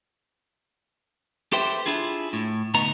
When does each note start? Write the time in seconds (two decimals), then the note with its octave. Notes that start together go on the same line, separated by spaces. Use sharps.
1.52 G4 A4 B4 C5 E5 G5
1.86 D4 E4 F4 G#4
2.33 A2
2.74 D2 B2 B3 D#4 A#5